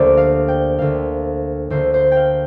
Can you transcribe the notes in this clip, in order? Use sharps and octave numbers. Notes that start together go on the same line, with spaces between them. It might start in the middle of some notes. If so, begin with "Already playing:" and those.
Already playing: D2 D3 A#3 F4 G4 A#4 C5 D5
F5
G5
D2 D3 A#3 F5
D2 D3 A#3 C5
C5
F5 G5